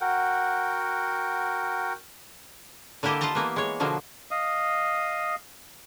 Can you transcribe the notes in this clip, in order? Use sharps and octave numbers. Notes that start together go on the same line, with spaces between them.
F#4 A#4 F#5 G5
D3 A#3 E4 G4 A4 D#5
F4 A4 D#5 A5 A#5
E3 A#3 B3
G#3 C#5
B2 D3 F3 F#3 A#3
D#5 F5 D#6